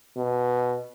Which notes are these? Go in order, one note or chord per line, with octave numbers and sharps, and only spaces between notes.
B2